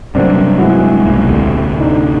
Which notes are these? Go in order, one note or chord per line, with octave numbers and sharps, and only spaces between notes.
G2 C3 F#3 A#3 C4 D4
G#3 E4 F#4
B1 C3 A#3
D2 A2 C3
D4 D#4